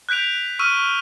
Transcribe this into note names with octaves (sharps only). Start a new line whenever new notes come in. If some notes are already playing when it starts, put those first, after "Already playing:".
F#6 G6 B6 D7 F7
C#6 E6 F6 D#7